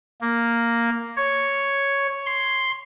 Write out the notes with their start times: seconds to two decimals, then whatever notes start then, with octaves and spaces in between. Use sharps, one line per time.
0.21 A#3
1.17 C#5
2.26 C6